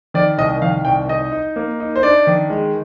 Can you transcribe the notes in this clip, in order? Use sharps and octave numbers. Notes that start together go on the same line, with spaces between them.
D#3 D5
C2 D#5
D#3 F5
C2 G5
D#4 D#5
D#4
A#3
D#4
C5
D4 D5
D#3
G#3